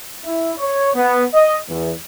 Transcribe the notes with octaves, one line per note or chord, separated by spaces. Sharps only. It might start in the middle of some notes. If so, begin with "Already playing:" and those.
E4
C#5
B3
D#5
E2